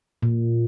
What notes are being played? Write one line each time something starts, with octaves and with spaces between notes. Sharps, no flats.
A#2